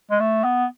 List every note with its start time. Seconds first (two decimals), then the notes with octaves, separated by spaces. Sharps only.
0.11 G#3
0.20 A3
0.44 B3